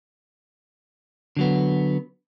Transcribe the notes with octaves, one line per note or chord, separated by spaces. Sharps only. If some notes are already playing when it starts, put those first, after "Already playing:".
D3 F#3 B3